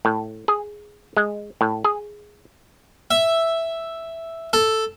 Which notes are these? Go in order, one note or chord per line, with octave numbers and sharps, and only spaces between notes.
A2
G#4
G#3
A2
G#4
E5
A4